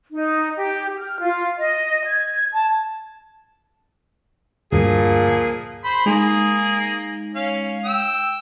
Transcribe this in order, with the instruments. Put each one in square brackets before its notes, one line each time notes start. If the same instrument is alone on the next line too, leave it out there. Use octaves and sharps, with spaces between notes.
[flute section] D#4
G4
F6
F4
D#5
G#6
A5
[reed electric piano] D2 G2 [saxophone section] A#2 F3 G#4
[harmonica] C5 B5
[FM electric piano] G#3 D#4 [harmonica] A#3 G#4
[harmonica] C#4 F5
G5 E6